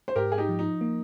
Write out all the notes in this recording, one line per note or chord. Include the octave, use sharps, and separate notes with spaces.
C5
G#2 G4 A#4
G#4
D#4 G4
F3
D#4
A#3